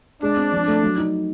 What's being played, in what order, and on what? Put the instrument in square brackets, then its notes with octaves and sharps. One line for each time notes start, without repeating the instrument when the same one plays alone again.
[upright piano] G#3 [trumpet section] D4
[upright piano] C4
F3
A3
F#3
D#4